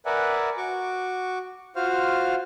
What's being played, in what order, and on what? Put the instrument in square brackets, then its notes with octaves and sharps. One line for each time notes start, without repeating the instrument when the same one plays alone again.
[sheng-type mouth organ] A#4 B4 D5 E5 F#5 G#5
F#4 C#6 D6
F4 F#4 C5 F5 F6